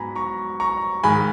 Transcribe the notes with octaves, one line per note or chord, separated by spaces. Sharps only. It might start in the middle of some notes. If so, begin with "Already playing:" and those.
Already playing: G#2 F#3 B3 G#5 A#5 B5
A#5 C#6
A#5 C#6
G#2 D#3 G#3 G#5 B5